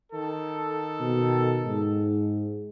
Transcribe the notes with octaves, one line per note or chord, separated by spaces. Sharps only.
D#3 A4
B2
G#2